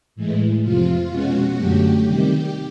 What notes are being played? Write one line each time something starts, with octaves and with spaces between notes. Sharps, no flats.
A2 E3 G#3
F2 C3 F3 F4
B2 G#3 C#4 F#4
F#2 D3 F#3 A3 G4
C3 D#3 G3 G4